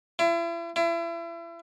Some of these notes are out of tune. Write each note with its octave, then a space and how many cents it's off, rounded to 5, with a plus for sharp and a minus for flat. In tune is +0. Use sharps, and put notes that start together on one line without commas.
E4 +40
E4 +35